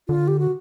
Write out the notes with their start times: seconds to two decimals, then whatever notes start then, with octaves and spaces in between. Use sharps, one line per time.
0.08 D3 F4
0.28 G4
0.39 F#4